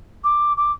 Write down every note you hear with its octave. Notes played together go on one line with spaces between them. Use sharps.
D6
D6